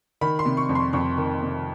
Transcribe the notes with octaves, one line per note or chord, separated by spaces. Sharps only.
D#3 B5
C6
C3
C#6
F2
C6
F2 C#6
D#3
C3